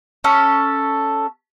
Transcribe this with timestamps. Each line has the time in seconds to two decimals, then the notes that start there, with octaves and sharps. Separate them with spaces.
0.24 C#4 A4